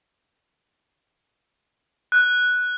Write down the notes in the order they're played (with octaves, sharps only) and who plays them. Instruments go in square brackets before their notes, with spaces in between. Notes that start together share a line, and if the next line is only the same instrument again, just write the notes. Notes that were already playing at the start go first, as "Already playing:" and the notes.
[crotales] F#6